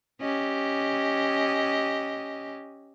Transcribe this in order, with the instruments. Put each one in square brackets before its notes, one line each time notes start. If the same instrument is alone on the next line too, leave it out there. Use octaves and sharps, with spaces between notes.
[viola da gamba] C#4 G4 D#5